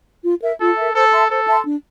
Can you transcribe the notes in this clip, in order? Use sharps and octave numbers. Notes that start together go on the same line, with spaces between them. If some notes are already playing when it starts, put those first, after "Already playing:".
F4
A#4 E5
F4 A4
A#4 E5
A4 C5
E5 A5 C6
A4 C5
E5 A5 C6
D4